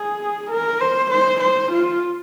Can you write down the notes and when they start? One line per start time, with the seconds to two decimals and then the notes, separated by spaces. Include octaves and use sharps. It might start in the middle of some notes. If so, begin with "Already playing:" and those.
Already playing: G#4
0.51 A#4
0.81 C5
1.11 C5
1.41 C5
1.72 F4